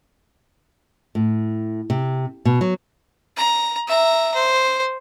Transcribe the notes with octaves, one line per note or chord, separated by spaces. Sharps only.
A2
C3
B2
F#3
A#5
E5 A#5
C5